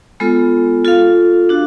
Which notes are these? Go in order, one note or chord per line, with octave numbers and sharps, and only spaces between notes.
G#3 B3 F4 A4
F4 A4 F5
D4 F#4